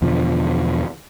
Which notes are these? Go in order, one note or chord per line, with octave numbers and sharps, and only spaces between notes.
E2 B2 D3 F3